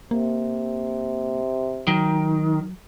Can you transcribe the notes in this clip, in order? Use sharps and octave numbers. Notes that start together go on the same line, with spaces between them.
C3 A#3
D#3 F#3